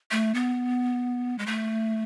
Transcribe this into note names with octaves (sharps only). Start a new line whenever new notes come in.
A3
B3
G#3
A3